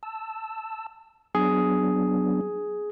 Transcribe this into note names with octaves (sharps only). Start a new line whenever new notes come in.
A5 E6
F#3 B3 D4 G#4